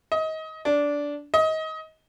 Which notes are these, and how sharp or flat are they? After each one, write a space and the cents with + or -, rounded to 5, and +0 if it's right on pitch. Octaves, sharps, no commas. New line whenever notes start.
D#5 +25
D4 -15
D#5 +25